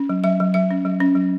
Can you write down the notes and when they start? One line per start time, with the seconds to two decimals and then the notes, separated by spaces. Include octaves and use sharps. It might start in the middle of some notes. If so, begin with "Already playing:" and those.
Already playing: C#4
0.09 F#3
0.24 F#3 E5
0.40 F#3
0.54 F#3 E5
0.71 C#4
0.85 F#3
1.00 C#4
1.15 F#3